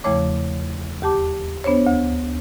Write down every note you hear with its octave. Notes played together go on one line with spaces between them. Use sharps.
E2 C#3 F3 A3 C#5 D6
D#2 G4 A5 D6
B3 D4 C5 C#5
D2